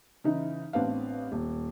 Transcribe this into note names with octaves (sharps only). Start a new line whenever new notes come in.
C#3 E3 D#4
A1 B3 C4 D4 F5
D#1